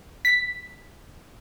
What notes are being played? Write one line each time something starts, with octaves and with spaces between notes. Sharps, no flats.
B6